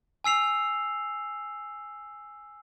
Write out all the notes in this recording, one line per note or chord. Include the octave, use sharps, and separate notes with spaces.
G#5 E6 C7 F7